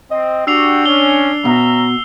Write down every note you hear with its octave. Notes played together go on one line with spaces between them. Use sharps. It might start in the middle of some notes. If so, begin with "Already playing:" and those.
C4 D#5
D4 F#4 G4 E6 C7 F7
C#4 G7
B2 C#4 E5 A#5